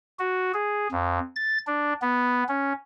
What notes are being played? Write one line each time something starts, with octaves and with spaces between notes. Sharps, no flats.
F#4
G#4
F2
A6
D4
B3
C#4